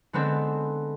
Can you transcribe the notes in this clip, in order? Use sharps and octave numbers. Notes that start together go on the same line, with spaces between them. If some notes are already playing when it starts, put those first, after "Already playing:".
D3 G#3 B3 C4 D4